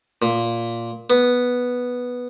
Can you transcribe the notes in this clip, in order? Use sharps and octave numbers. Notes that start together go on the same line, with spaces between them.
A#2
B3